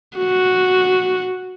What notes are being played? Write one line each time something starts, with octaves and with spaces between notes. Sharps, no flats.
F#4